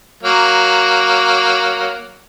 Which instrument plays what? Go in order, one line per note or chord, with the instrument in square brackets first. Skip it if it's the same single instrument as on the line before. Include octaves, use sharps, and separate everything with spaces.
[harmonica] F#3 A#3